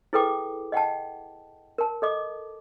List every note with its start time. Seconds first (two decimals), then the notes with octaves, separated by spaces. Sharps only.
0.13 E4 G#4 A4 B4 G5 D6
0.72 D#5 F#5 G5 A5
1.78 A#4 A5
2.02 A4 D#5 D6